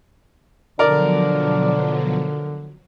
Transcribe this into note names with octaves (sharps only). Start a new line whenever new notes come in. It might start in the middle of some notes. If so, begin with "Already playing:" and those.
B2 D3 F3 F#3 D4 A#4 D5